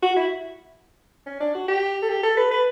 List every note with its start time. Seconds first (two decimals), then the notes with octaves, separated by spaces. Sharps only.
0.03 F#4
0.16 E4
1.27 C#4
1.41 D4
1.55 F#4
1.68 G4
2.02 A4
2.09 G4
2.23 A4
2.37 B4
2.51 B4